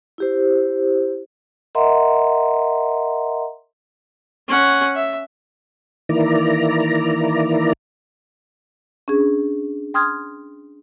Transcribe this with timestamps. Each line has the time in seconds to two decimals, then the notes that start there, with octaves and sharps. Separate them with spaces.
0.18 E4 G4 C5
1.75 A#4 D#5 E5 F#5 A#5 C6
4.48 C#4 F#5
4.96 E5
6.09 D#3 E3 A#3 E4 D5 A#5
9.08 C#4 D4 G#4
9.94 G5 C6 D#6 F6 G#6